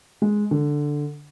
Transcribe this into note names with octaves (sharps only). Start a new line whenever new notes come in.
G#3
D3